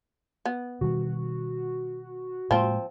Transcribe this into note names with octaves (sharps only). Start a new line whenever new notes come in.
B3
B2 D#3 G3 F#4
A2 F3 G#3 A#3 C4